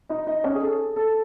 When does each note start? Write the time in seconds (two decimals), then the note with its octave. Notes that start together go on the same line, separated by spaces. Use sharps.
0.09 D#4 D#5
0.27 D#4 D#5
0.44 C#4 C#5
0.55 G#4
0.62 A4
0.96 A4